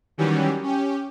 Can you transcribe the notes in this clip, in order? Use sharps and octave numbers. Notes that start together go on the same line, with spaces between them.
D#3 E3 F#3 G3 C#4 G4
C#4 G4